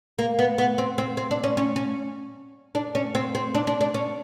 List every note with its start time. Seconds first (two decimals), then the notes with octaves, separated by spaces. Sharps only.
0.19 A#3
0.39 B3
0.58 B3
0.78 C4
0.98 C4
1.17 C4
1.31 D4
1.44 C#4
1.57 C#4
1.76 C#4
2.75 D4
2.95 C#4
3.15 C4
3.35 C4
3.55 D4
3.67 D4
3.81 D4
3.94 C#4